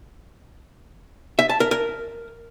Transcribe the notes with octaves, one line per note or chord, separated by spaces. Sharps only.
E5
A5
A#4
A#4